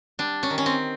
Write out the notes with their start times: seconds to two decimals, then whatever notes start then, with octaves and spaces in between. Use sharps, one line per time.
0.19 G3 D4
0.43 C#4
0.50 D#3
0.58 C#4
0.66 C4